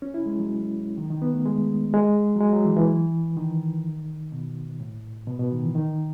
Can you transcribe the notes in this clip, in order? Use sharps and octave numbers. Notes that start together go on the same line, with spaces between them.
C#4
E4
G#3
F#3
D#3
D#3
B3
A3
G#3
G#3
F#3
G#3
F#3
E3
E3
D#3
B2
A2
B2
B2
D#3
E3
D#3